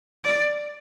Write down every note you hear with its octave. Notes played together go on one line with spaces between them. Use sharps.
D5